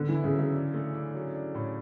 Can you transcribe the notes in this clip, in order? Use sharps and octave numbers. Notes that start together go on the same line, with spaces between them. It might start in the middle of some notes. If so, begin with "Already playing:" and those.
Already playing: D3 B3
E3
E4
C#3
F#3
C#3
D4
A3
D4
F#3
D4
A2